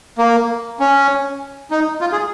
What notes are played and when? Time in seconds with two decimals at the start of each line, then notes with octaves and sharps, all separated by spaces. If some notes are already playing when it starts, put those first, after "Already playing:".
0.18 A#3
0.80 C#4
1.71 D#4
2.01 F4
2.12 G#4